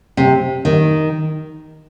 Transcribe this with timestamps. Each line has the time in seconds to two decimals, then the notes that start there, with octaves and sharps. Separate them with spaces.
0.17 C3
0.65 D#3